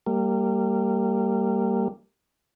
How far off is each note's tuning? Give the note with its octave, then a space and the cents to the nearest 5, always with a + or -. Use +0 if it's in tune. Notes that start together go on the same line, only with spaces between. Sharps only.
G3 +0 A#3 -25